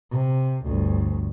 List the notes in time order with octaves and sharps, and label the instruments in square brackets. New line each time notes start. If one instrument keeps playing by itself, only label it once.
[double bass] C3
G1 D2